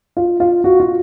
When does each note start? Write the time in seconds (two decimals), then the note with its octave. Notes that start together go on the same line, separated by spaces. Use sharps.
0.17 F4
0.40 F4
0.64 F#4
0.80 F4